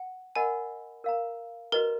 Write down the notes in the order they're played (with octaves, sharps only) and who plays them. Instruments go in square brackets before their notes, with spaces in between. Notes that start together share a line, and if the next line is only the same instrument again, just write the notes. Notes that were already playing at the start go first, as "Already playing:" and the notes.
Already playing: [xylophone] F#5
[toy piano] A#4 D#5 F#5 B5 [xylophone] G#5
[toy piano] A#4 F5 A#5
[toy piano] F#4 B4 D#5 A#5 [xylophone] A#4